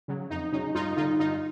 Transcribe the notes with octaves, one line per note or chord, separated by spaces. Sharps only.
C#3 F#3
F2 D#4
C#3 F#3 D#4
G2 D#4 F4
D3 G3 D#4 F4
G2 D#4 F4